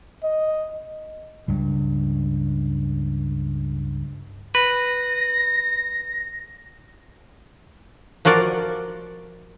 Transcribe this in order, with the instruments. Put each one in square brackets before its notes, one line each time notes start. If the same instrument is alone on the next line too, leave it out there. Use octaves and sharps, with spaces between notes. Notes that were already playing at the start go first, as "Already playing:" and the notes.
[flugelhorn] D#5
[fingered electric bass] C#2 G2
[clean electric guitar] B4 [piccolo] A#6
[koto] F3 F#4 A#4 D5